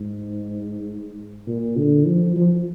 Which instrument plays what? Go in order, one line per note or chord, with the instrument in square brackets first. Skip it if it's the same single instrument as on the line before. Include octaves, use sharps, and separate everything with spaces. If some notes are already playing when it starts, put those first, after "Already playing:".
Already playing: [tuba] G#2
A#2
D3
F3
F3